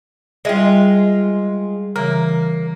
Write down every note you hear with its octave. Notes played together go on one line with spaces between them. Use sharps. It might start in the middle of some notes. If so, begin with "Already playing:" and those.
G3 G#3 F4 D#5 E5
C#3 E3 A#3